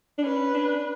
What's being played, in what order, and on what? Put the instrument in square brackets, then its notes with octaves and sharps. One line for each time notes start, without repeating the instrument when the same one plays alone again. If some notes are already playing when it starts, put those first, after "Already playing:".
[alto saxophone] D4
[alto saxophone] C#4 [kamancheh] B4
[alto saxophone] D4